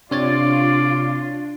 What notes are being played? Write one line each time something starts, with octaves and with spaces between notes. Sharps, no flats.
C3 D4 F4 C#5 D5 A6